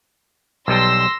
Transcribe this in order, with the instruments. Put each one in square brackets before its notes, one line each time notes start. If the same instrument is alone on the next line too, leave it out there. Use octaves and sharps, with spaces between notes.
[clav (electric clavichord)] B1 G3 A5 [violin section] C6 E6 A#6